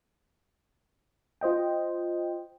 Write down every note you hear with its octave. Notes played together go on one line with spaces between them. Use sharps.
F4 C5 D#5 G5